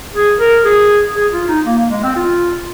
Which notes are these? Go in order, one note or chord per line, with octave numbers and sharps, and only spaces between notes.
G#4
A#4
G#4
G#4
F4
D#4
A#3
A#3
G#3
C4
F4